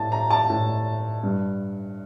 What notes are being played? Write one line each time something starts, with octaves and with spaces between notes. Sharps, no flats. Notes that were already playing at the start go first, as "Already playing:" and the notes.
Already playing: A2 A5
A#5
A5
A2
G2